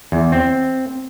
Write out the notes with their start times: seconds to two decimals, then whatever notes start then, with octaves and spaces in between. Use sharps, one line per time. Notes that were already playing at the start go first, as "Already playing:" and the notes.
0.12 E2
0.32 C4